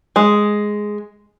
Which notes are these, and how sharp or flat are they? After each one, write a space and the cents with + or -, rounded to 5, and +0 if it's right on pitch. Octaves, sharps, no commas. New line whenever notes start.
G#3 +0